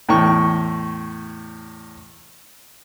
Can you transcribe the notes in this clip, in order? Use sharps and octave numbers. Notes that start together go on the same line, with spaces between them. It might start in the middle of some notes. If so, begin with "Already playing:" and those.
E2 A2 G5 C#6